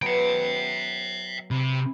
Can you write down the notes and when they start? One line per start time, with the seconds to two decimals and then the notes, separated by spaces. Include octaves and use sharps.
0.02 F#3 B3 E5 G5
1.51 C3 E4